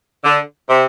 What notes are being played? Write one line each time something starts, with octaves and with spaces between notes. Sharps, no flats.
D3
C3